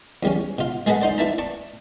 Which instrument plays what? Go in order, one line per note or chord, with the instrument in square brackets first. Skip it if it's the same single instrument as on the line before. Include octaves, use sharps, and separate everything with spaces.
[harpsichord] E2 G3 C#4
B2 F4
G#3 G#4 A4 B4 D#5 F#5
D#4 C5 D5
E4 B4 D5 E5 A5 A#5
D5 A5 C#6